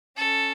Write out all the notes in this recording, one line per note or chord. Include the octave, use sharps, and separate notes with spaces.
C#4 A4